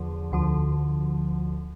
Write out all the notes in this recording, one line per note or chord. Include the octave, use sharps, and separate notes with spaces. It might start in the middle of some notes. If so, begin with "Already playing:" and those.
Already playing: E2 D3 F3
D2 D3 F3